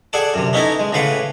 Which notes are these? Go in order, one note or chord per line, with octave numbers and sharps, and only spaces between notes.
G#4 A4 D5 F#5 G5 A5
F#2 C3
B3 C#4 D#4 E4 A4 A#5
G#3
A2 C#3 B4 F5 F#5 D6